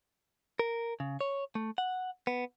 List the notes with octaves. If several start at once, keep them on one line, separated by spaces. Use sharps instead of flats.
A#4
C#3
C#5
A3
F#5
B3